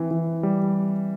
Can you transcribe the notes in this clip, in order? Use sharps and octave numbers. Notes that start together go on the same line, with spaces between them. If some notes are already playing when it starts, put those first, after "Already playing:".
Already playing: E3 C4
E3
G3